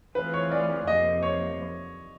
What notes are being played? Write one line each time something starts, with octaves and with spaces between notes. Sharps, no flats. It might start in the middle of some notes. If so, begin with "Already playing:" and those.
E3 A3 C4 F4 G#4 B4
C#5
D5
F2 C3 F3 A#3 D#5
C#5